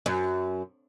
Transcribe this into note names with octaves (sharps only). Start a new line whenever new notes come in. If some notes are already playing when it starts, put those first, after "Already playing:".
F#2